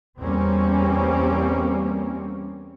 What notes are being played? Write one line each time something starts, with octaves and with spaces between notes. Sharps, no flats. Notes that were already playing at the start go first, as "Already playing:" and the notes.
E2 G3 A#3 C4 C#4